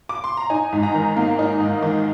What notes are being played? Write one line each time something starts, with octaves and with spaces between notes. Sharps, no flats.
D6
C6
A#5
D#4 G#5
G#2
A#5
D#3
A#3
D#4
G#2
D#3